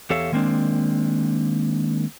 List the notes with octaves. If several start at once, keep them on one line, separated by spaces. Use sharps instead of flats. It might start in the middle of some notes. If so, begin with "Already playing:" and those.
E2 G4 A4 C#5 E5 F5
D#3 G#3 A#3 C4 D4